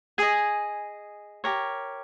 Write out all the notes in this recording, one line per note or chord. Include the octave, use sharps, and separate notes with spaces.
G#4 D#5 G#5
G4 A#4 C#5